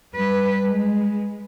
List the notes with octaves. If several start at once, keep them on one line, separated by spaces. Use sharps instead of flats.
G3 B4
G#3